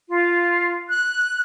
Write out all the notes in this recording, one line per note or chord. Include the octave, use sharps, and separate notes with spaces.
F4
F#6